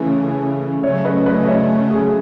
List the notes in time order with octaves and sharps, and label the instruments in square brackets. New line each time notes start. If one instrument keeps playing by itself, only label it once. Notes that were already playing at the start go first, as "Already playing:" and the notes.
Already playing: [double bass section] C#3 E3 A3 C#4
[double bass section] C#3 F#3 A3 C#4 [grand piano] C#5 E5
[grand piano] B4 D#5
B4 D#5
D#5
C#5 E5
G#4